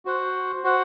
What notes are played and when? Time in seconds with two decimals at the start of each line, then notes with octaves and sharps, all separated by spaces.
0.05 F#4 C5 F#5
0.63 F#4 C5 F#5